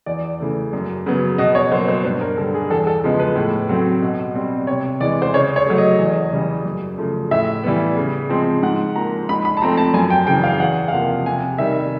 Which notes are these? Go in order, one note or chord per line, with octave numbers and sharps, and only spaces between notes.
E2 D5
C#3 E3 A3
F#2
C#3 F#3 B3
B2 D#5
C#5
F#3 A#3 C5
C5
G2 B4
A#4
D3 G3 A4
G#4
E2 A4
A4
C#3 F3 G#3 B3
B4
A2
F#3 A3 C4
B2
G3 C4
C3 C#5
E3 G#3 D5
C5
C#3 C#5
C#5
F#3 A3
D#5
E2
C#3 E3 G3
F#2
C#3 F3 A3
A2 E5
E3 G3 B3
C#3
F3 G#3 C4
G#2 F#5
F3 A#3 A#5
G#2 B5
B5
A5
F3 A3 C4 A#5
A5
F#2 G#5
G5
C#3 E3 G5
F5
E2 F#5
F5
C3 F3 A#3 F#5
C3 G#5
D#3 G3 E5